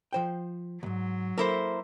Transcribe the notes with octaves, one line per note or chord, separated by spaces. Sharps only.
F3 C5 G5
D2 G#2 F#3
A#3 E4 A4 A#4 C5